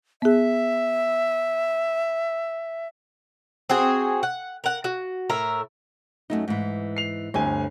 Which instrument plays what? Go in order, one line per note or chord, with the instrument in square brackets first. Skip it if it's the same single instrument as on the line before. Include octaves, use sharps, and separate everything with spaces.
[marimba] B3 G#4 [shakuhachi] E5
[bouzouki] C4 F#4 G#4
F#5
A#4 F#5
F#4
A2 A#4 E5 A#5
[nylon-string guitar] F#2 A3 D#4
G#2 E3
[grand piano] C7 F7
[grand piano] G1 D2 G#5 [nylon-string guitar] C4